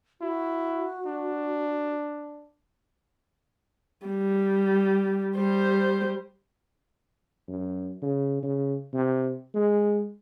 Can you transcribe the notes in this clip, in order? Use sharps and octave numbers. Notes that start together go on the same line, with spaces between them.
E4 F#4
D4
G3
G3 C5
F#2
C#3
C#3
C3
G#3